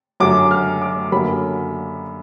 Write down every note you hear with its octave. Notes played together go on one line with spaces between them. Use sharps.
F#2 D3 F#3 D6
F6
D6
F#2 D3 F#3 A#3 B5